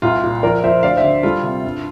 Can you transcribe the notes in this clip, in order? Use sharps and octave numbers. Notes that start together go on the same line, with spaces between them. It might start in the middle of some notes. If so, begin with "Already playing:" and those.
C2 F4
A#2
F3 A#4 D5
F3 C5 E5
D2 D5 F5
C5 E5
D3
G3 F4 A4
C3
G2